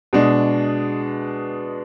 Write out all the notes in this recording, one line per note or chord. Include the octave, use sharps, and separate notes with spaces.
B2 G#3 D4